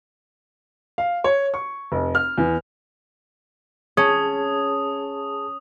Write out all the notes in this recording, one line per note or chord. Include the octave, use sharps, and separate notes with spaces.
F5
C#5
C#6
F1
F6
E2
C#4 G#4 A5 D#6